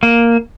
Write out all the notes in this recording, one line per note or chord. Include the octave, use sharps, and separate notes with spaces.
A#3